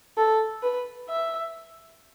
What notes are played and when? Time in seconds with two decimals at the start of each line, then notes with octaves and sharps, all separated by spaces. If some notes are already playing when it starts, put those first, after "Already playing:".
0.18 A4
0.63 B4
1.09 E5